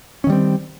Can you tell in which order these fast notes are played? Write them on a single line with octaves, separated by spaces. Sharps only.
C#4 D#3 G3 C4